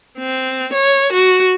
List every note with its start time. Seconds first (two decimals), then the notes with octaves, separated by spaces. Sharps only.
0.18 C4
0.73 C#5
1.12 F#4